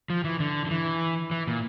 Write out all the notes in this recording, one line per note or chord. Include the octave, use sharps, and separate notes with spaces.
F3
E3
D3
D3
E3
E3
A#2